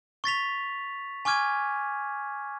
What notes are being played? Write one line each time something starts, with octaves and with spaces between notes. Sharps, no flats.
C#6 A6 B6 F7
G#5 C#6 D6 F6 G#6 D#7